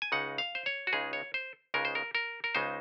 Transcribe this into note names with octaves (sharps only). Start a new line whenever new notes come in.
G#5
C#2 C#3 G#3 D#4 F#5
F5
C5
C#5
F#4
C#2 C#3 G#3 D#4 G#4
C#5
C5
C#2 C#3 G#3 D#4 A#4
C5
A#4
A#4
A#4
C#2 C#3 G#3 D#4 C5